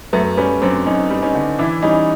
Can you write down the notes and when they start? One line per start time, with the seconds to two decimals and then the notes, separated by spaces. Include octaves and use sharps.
0.13 F#2 A3 B3
0.37 G3 B3 C#4
0.62 F#2 C4 D4
0.86 F#2 C#4 D#4
1.10 G3
1.22 C#4 D#4
1.35 D3
1.59 E3 D4 E4
1.83 G3 C#4 D#4